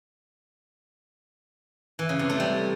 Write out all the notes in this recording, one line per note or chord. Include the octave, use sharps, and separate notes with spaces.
E3
C#3
C3
A3
G3